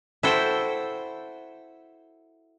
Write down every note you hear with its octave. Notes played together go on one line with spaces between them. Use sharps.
E4 F#4 A4 C5 G5